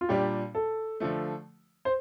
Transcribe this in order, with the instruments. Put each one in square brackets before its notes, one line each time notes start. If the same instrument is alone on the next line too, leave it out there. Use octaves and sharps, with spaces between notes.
[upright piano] F4
[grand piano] A#2 G3 D4 [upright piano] G4
[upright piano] A4
[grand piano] D3 F3 A3
[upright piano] C5